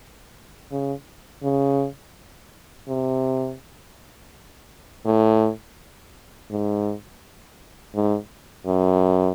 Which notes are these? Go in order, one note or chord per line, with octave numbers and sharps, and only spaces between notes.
C#3
C#3
C3
A2
G#2
G#2
F#2